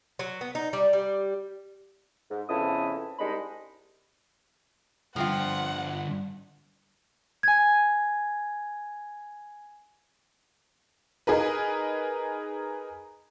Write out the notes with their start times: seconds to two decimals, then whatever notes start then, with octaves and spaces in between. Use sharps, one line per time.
0.19 F#3
0.41 B3
0.55 D#4
0.73 G3
0.93 G3
2.31 G#2
2.49 F2 C#3 B3 E4 A5 D#6
3.19 C2 G#3 D4 D#4 D#5 B5
5.16 G2 D3 F3 C4 F4 F#5
7.43 G#5 G#6
11.27 D#4 G#4 A#4 B4